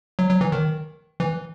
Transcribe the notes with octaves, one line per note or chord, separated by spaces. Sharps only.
F#3
F#3
E3
D#3
E3